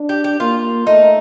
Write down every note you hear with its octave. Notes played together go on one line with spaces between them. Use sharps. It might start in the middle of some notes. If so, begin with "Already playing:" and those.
Already playing: D4
G4
G4
A#3 F4
A3 D#4